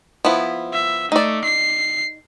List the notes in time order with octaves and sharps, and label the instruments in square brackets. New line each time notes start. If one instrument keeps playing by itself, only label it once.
[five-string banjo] F3 B3 E4
[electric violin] E5
[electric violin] A3 [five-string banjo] D#4 D5
[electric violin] C7